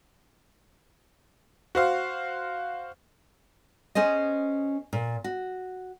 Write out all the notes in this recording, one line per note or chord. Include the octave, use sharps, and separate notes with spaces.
F#4 C5 F5
C#4 G#4 C5 D#5
A#2
F#4